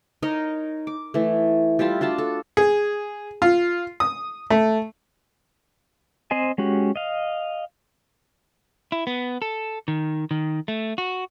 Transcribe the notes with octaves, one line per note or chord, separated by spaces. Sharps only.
D#4 A#4 C#5 D#5
D6
E3 A3
G3 E4 F4 A5
D4 F4 F#4 A5
A4
G#4
F4
D#6
A3
C4 C5 D#5 G#5
G#3 C#4 F#4 G4
D#5 F5
E4
B3
A4
D#3
D#3
A3
F#4